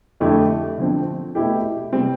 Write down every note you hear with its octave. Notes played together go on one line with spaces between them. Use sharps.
F2 D3 A3 E4 G4
D3 F3 C4
B2 A3 E4 G4
C3 G3 C4